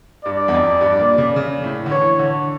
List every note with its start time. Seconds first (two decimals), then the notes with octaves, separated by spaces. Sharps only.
0.25 G2 D5
0.48 E2
0.53 F2
0.81 G2
1.00 A#2
1.18 C#3
1.36 C#3
1.64 A2
1.86 D3
1.91 E3 C#5
2.19 D3